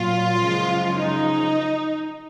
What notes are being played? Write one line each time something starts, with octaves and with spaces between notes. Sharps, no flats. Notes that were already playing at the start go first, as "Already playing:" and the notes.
Already playing: A#2 F#3 F4
F#2 C#3 F3 G#3
D#4